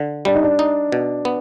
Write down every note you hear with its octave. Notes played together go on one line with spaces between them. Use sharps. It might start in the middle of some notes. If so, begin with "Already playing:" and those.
Already playing: D3
G3 D4
D#4
D4
D#4
B2
B3